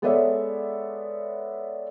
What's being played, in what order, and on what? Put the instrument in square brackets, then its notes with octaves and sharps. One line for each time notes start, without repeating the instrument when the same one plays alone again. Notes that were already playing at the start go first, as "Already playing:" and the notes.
[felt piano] G#3 B3 A4 C#5 D5 E5